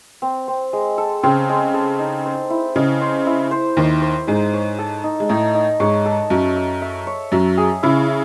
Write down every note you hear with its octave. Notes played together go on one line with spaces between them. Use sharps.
C4
C4
G#3
A4
C#3 C4
G#3
A4
D#4
C5
E4
C#3 D#5
C5
E4
C5
D#2 D#3 C5
C5
G#2 G#3 D#4
C#5
A4
D#4
G#3
A2 A3 D#4
D#4
G#2 G#3 C#5
A4
F#2 F#3 E5
E5
E5
C#5
F#2 F#3 E5
G#4
C#3 E4
E4